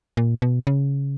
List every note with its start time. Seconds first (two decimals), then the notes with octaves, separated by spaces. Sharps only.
0.17 A#2
0.42 B2
0.67 C#3